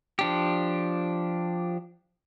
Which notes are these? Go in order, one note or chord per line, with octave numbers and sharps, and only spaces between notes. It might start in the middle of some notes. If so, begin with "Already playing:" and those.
F3 D4 G4